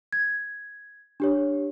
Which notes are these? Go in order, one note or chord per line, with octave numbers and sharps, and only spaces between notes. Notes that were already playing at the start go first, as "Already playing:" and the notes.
G#6
D4 G4 C#5